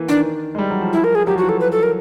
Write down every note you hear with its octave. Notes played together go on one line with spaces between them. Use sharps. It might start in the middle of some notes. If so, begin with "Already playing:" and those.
Already playing: E3 A#3
D#3 D4
G#3
G3
F#3
F3
E4
A#4
G#4
F#3 G4
F3 F#4
E3
A4
B4
A4
A#4